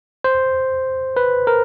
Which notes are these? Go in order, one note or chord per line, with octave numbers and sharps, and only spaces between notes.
C5
B4
A#4